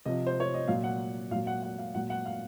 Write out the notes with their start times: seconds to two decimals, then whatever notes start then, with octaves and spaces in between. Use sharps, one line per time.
0.06 C3 F3 D#5
0.26 C5
0.40 C#5
0.54 D#5
0.68 A#2 F#3 F5
0.84 F#5
1.31 A#2 F5
1.35 F#3
1.47 F#5
1.63 F#5
1.78 F5
1.95 A#2 F#3 F#5
2.10 F#5
2.25 F5